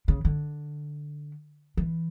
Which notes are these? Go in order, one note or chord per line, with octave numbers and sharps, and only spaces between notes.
C#3
D3
E3